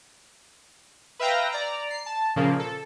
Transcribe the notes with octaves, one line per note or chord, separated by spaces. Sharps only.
B4 E5 F5 G5 A#5 A#6
D5 A#5
C7
A5
A#2 C#3 F3 A#3
A4